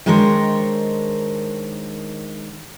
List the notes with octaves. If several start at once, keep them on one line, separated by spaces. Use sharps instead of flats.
D#3 G#3 D4 A#4 C5 C#5